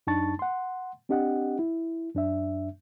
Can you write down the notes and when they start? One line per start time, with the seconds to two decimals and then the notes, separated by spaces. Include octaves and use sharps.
0.07 F#2 D4 D#4 A5 C#6 A6
0.39 F#5 C6
1.09 C4 D4 G4 D#5 F#5
1.59 E4
2.14 F#2 D4 E5